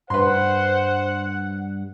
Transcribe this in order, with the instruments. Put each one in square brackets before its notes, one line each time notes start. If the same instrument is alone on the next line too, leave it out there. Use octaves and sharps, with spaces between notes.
[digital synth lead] G2 [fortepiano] B4 C6 [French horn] C5 [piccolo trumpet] F#5